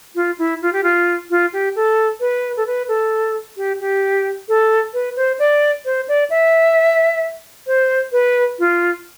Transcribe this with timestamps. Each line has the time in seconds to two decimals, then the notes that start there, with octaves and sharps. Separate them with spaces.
0.15 F4
0.38 E4
0.62 F4
0.73 G4
0.83 F4
1.30 F4
1.53 G4
1.76 A4
2.20 B4
2.57 A4
2.67 B4
2.88 A4
3.57 G4
3.80 G4
4.48 A4
4.94 B4
5.17 C5
5.39 D5
5.85 C5
6.08 D5
6.30 E5
7.67 C5
8.12 B4
8.59 F4